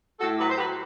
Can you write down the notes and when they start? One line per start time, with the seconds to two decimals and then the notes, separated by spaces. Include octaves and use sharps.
0.20 A2 F#4 A4
0.38 F#3 G4 B4
0.49 C5
0.57 F#3 G4 B4